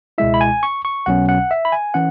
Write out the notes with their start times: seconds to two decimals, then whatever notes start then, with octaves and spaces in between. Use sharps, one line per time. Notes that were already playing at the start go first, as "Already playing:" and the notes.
0.18 C#2 B2 G#3 E4 E5
0.34 B5
0.41 G#5
0.63 C#6
0.85 C#6
1.06 B1 B2 F#3 C#4 F#5
1.29 F#5
1.51 E5
1.65 B5
1.72 G#5
1.94 E3 C#4 F#5